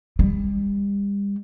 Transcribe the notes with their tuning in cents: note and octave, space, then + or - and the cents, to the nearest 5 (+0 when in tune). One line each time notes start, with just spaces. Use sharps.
G3 +35